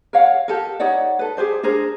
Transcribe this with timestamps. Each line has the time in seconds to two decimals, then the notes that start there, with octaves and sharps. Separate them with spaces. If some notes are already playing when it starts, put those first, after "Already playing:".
0.13 A#4 C#5 F5 F#5
0.48 G4 A4 A#4
0.80 D#4 C#5 D5 F#5
1.19 A4 B4
1.37 G4 G#4 C5 D5
1.63 D4 G#4 A#4 C5